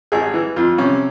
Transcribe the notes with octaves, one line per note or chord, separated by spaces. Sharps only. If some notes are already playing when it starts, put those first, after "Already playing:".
G#1 G#4
E3
F2 F4
C3 C#4